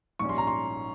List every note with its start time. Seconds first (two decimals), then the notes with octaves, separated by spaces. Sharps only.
0.19 A#1 G#2 G3 C#4 C#6
0.29 C6
0.38 A#5
0.47 C6